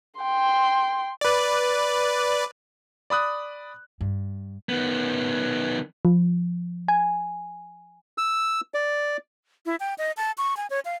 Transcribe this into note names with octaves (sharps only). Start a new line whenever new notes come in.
G5 C6
B4 D5
D5 B5 D#6 F#6
G2
D#3 B3
F3
G#5
E6
D5
E4
G5
D#5
A5
C#6
G#5
C#5
F5